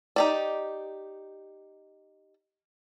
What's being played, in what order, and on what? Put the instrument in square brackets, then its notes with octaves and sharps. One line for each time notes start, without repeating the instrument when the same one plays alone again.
[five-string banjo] D#4 G4 D5